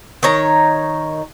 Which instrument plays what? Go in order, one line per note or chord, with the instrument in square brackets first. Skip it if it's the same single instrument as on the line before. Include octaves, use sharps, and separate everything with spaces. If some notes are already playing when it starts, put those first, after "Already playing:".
[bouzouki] D#3 D#4 C#5 A#5